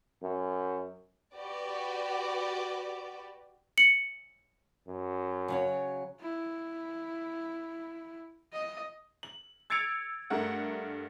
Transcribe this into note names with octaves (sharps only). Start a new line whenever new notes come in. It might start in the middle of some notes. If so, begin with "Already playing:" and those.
F#2
F#4 G4 B4 D5
C#7 F#7
F#2
C#3 F#3 C#5
E4
D#5
F#7
E6 G#6 A6 C#7 D7 F7
G2 A3 A#4 F#5